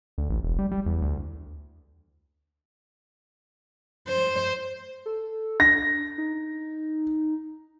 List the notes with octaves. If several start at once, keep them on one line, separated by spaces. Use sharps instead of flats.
D2
A1
E1
G3
G3
E2
D2
C5
A4
D4 A#6
D#4